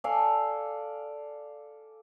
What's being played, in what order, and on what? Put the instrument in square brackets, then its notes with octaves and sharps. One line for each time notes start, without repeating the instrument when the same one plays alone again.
[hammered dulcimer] A4 D5 F5 G#5